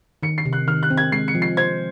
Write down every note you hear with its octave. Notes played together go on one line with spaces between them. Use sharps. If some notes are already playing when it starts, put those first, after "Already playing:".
D#3 C#7
C7
C3
F#6
D#3 F6
F#6
C4
G#6
G#3 C7
C#7
F3
C7
C5 G#6